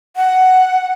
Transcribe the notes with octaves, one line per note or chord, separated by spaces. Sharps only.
F#5